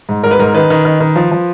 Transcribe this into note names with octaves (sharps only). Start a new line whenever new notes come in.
G#2
G#2 A#4
B4
G#2 A#4
D#3 B4
D#3
D#3
D#3
F3
F3